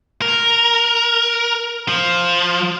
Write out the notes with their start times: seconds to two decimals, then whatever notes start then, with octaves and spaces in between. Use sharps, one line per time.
0.22 A#4
1.88 F3